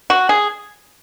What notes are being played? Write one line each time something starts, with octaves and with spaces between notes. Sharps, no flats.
F#4
G#4